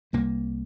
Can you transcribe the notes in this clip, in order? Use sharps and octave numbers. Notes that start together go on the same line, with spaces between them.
C2 C3 G3 A#3